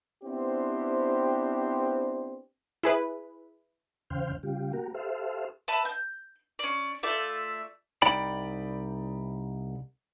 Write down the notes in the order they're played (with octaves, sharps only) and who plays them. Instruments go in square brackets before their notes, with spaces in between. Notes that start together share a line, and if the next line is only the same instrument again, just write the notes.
[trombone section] B3 C4 D4 E4 G4 C5
[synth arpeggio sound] E4 G#4 B4
[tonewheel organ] E2 C#3 C5 F5 G5
C#3 G3 F4 G4
A#3 F#4 G4 A#4
G4 A4 C5 E5 F5
[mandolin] B4 E5 A5 B5
G6
C#4 D5
A3 F4 D5 E5
[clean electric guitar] C2 D#4 D5 G5 B5